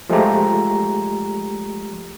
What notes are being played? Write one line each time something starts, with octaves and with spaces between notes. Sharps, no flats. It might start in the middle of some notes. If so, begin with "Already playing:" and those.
F3 G#3 A3 G4 A#5